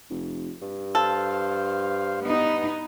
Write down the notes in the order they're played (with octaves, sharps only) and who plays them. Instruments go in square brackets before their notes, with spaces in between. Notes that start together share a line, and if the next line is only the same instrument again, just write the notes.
[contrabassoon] F1
G2
[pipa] A4 [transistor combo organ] C5 F5
[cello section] B3 D#4